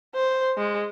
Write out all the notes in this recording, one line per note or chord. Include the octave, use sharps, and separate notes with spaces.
C5
G#3